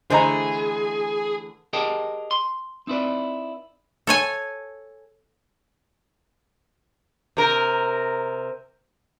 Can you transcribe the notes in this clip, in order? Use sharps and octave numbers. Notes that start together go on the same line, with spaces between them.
D3 E3 A3 G#4 C5 D#5 A#5
G4 G#4 A#4 D#5 G5 A5
C6
C4 D#4 E4 B4 D5
A4 C#5 G#5
C3 A#4